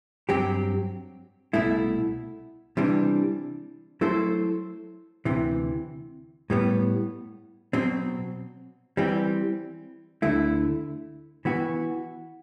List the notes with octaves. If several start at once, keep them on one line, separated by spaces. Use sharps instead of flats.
G2 F#3 C4 G4
C2 B2 A3 E4
C3 E3 G3 D4
F#3 A3 E4 A4 C5
D2 C3 E3
A2 G3 B3
B2 F#3 C4
E3 G3 C4
D2 D3 A3 E4
E3 B3 F#4